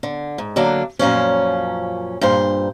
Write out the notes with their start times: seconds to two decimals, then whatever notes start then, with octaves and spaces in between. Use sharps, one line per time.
0.03 D3
0.38 G#2
0.56 D3 F#3 A#3 D4
0.99 F#2 A#2 F3 C#4
2.21 G2 A#2 C5